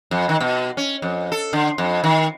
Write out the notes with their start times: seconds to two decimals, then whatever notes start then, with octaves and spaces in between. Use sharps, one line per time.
0.11 F2
0.29 D#3
0.40 B2
0.77 C#4
1.02 F2
1.32 A4
1.53 D3
1.78 F2
2.04 D#3